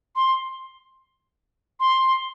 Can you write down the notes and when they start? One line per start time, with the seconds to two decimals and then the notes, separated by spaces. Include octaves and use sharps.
0.16 C6
1.80 C6